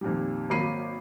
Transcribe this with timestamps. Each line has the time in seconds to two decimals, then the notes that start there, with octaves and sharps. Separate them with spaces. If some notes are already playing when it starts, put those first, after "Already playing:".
0.01 F2 A#2 D#3 G3
0.50 G#1 F#3 A#3 B5 C7 D#7